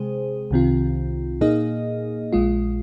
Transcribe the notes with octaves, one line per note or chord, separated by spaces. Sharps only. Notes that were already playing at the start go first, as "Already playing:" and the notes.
Already playing: C3 G#3 G#4 C5
C2 C3 D#3 C4 F4
A#2 A#3 D#4 G#4 D#5
A#1 A#2 G#3 F4